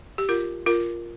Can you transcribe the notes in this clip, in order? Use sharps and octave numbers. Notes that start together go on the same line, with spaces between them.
G4
F4 A#4
F4 A#4